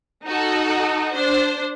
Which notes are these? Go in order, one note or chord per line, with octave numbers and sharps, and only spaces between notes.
D#4 F#4 A4
D4 C5